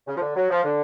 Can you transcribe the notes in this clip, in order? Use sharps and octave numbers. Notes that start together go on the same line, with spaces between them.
C#3
F3
D3
F#3
F3
D3